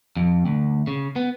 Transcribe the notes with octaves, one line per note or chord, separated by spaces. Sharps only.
F2
D2
C#3
B3